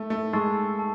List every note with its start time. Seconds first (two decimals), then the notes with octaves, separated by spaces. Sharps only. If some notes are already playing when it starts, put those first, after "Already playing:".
Already playing: A3
0.10 A3
0.33 G#3 A5 C#6 E6 A6 C7
0.79 A5